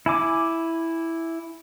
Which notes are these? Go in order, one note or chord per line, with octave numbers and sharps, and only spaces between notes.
E4 G#5 D6